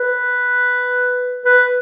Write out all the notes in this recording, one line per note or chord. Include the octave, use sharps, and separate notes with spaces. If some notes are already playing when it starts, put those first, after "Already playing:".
Already playing: B4
B4